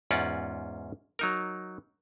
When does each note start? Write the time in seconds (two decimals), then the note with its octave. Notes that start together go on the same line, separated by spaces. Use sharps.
0.11 E2 G#2 C#4 F4 D5 F#5
1.19 F#3 D#4 A#4